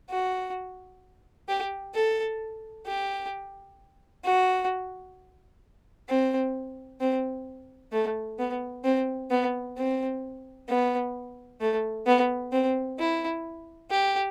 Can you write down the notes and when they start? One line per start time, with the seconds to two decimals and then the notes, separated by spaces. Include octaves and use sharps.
0.10 F#4
1.48 G4
1.94 A4
2.86 G4
4.25 F#4
6.09 C4
7.00 C4
7.92 A3
8.38 B3
8.84 C4
9.30 B3
9.77 C4
10.69 B3
11.61 A3
12.06 B3
12.52 C4
12.99 E4
13.90 G4